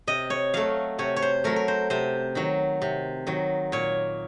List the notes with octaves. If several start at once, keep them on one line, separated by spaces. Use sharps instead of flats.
C3 D#5
C#5
F#3 A3 F5
C3 C#5
C#5
C5
F#3 A3 A#4
A#4
C5
C3 C5
D#3 F#3
C3
D#3 F#3
A#2 C#5